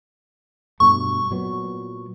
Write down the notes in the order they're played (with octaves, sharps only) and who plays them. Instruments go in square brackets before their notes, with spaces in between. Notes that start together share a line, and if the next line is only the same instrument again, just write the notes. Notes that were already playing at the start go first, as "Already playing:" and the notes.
[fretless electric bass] G2 B2 A3 [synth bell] C#6
[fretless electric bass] A#2 F#3 B3